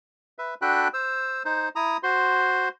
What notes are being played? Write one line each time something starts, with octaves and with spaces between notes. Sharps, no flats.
B4 E5
D4 F#4 A4 G5 B5 F#6
C5 E6
D#4 C5
E4 A#5 D#6
F#4 C5 C6